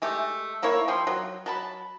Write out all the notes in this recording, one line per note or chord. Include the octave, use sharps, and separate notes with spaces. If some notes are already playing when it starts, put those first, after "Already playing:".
G#3 A3 G4
D3 A#3 E4 C#5
F3 G3 G5 C6
F#3
F#3 A5 B5